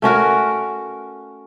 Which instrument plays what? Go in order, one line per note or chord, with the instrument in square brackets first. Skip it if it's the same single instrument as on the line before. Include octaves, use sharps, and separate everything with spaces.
[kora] A3 C#4 F#4 A#4